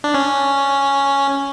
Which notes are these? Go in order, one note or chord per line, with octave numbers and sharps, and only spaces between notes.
D4
C#4